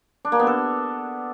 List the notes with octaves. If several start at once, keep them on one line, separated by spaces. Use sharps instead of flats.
D4
A#3
B3
A4